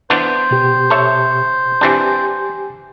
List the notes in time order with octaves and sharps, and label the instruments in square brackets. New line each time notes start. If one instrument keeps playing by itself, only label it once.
[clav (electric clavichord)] E3 B3 D4 [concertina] C5
[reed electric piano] B2 G4
[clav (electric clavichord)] A4 C#5 E5
[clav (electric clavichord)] E3 C4 D4 [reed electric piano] G4 G#5